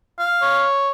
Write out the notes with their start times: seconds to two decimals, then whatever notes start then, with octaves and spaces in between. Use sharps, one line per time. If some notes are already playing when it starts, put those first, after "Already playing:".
0.19 F5
0.42 C#5